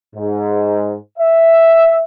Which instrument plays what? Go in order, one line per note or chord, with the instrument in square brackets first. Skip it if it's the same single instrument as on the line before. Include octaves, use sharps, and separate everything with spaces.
[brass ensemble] G#2
E5